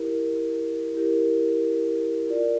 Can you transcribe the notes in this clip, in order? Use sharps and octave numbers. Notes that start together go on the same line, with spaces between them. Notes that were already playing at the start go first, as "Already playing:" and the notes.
Already playing: E4 G4 A#4
E4 G4 A#4
F4 A#4 D5